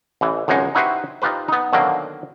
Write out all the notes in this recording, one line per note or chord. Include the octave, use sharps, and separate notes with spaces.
A1 E3
G#1 C#2 F#2 G#3 D#4
D#4 E4 F#4 G4 B4 C5
D#4 F4 G4 B4 C5
B3 D#4
B2 D3 D#3 F#3 A#3 C4